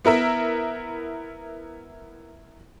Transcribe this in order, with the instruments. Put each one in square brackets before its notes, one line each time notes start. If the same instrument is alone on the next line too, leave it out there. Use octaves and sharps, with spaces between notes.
[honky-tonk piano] B3 E4 A#4 E5